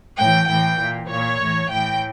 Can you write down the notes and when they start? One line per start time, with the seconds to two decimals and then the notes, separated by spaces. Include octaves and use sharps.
0.17 A2 E3 G5
0.48 A2 E3 G5
0.79 A#2
1.09 A#2 C#5
1.39 A2 E3
1.69 A2 E3 G5